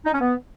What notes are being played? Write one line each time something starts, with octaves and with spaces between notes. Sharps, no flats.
D#4
C#4
B3